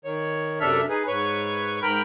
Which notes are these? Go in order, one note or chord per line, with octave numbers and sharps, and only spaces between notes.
D#3 C#5
F#2 C3 D4 A4 E5 F6
D#4 G#4 B4
G#2 B4 C#5 C#6
G#2 A#4 G5 B5 F6